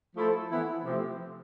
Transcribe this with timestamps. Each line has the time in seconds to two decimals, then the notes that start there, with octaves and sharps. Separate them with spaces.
0.15 F3 A3 E4 A4 C5
0.49 E3 B3 E4
0.84 C3 F3 A3 C4 G4